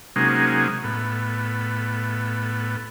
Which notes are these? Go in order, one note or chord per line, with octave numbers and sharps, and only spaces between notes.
C3 F#3 G#3 A#3 C#4 D#4
A2 B3